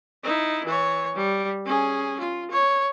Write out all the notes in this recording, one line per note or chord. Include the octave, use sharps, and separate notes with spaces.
D#4 E4
E3 C#5
G3
C#4 G#4
F4
C#5